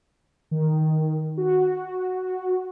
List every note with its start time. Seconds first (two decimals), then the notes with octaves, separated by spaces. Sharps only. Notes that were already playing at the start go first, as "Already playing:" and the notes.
0.51 D#3
1.37 F#4